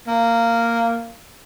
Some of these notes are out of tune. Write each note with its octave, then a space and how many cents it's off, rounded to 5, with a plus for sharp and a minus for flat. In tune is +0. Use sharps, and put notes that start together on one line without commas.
A#3 -10